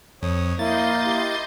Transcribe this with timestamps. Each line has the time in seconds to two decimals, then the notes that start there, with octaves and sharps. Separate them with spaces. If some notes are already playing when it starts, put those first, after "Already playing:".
0.22 F2 C#5 D#6
0.59 A#3 E4 D#5 C6 G6 A6
1.06 E4 G4